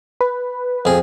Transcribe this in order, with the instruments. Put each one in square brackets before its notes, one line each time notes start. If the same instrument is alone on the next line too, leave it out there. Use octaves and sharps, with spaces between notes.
[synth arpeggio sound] B4
[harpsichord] F2 G#4